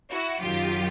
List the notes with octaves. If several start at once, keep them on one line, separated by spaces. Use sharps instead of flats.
E4 F#4
F#2 D#3 F#3 F4 G4